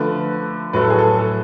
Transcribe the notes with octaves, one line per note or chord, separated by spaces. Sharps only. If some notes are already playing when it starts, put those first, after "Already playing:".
Already playing: D3 F3 A3 B4
A2 F#3 A3 B4
A4
G#4
A4
A4